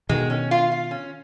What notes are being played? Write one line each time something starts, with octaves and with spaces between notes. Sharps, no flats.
B2 D#3 G#3
C#4
F4
F4
C#4